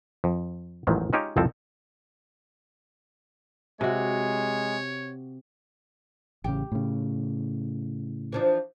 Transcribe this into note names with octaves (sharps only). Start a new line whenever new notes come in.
F2
A1 E2 G#2 D#3 F3 F#3
G#3 C#4 D#4 F4 G4 C#5
C2 F2 F3 C4 A4 A5
C3 G#3 F#4 C#5
A1 C#3 G4
A2 C#3
E3 F3 D4